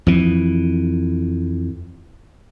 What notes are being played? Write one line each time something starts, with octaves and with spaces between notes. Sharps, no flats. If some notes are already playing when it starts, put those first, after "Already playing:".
F2 E3